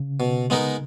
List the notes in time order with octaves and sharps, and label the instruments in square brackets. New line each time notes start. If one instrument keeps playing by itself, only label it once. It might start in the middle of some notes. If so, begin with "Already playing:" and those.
Already playing: [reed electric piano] C#3
[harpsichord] B2
G#3 B3 D#4 A#4